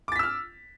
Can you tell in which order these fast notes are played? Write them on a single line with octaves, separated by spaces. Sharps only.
D6 A6 B6 E6 F6